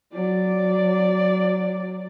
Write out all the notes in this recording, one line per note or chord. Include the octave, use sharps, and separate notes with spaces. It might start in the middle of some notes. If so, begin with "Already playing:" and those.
F#3 D5